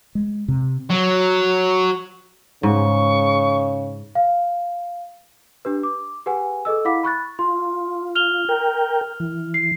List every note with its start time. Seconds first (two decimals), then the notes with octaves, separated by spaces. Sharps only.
0.15 G#3
0.48 C3
0.90 F#3
2.63 G#2 C#3 C#6
4.15 F5
5.65 D4 G4 B4
5.83 D6
6.26 G4 G#4 B4 F#5 G#5
6.65 G#4 A4 D#5 E6
6.85 E4 F5 F#5 B5 D6 B6
7.03 B5 C#6 F#6 A6
7.39 F4 C6
8.15 F6 F7 G7
8.49 A#4 G5
9.20 E3
9.54 C7